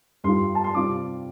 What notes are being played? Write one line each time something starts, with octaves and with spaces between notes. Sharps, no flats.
G2 G3 D4 F4 C6
A5
C6
C3 G3 C4 F4 D6